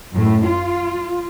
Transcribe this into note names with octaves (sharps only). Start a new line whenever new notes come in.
F#2 A2
F4